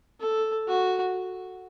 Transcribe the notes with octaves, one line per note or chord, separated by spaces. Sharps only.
A4
F#4